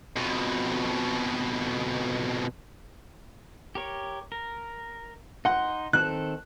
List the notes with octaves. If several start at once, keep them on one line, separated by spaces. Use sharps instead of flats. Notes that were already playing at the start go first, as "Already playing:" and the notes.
F2 B2
G4 A#4 C#5
A#4
D#4 F#5 C6 G6
D#3 C4 A4 F#6